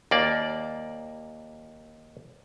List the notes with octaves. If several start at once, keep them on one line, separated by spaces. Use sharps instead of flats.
D#2 A#3 D5